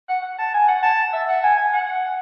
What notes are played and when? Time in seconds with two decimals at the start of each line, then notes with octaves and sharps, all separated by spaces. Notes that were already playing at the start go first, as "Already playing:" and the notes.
0.09 F#5
0.23 F#5
0.39 A5
0.54 G#5
0.68 F#5
0.83 A5
1.13 E5
1.29 F#5
1.44 G#5
1.57 G#5
1.73 F#5